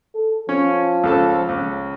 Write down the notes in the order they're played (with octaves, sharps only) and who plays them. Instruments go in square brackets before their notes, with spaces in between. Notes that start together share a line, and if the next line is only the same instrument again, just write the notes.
[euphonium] A4
[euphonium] F3 [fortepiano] C#4
[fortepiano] C#2 A4 A5
C#2